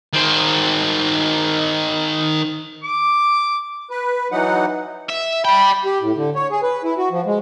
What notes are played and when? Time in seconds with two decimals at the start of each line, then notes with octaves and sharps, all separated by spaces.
0.13 D#3 C5
2.84 D6
3.90 B4
4.32 E3 F#3 D#4 F#5
5.09 E5
5.45 D5 G5 B5
5.85 G4
6.01 A2
6.16 D3
6.35 C#5
6.51 G#4
6.63 B4
6.84 E4
6.98 F#4
7.11 F3
7.26 G#3